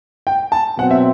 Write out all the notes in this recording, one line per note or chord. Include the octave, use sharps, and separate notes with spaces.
G5
A5
B2 F#3 C4 F#5
E5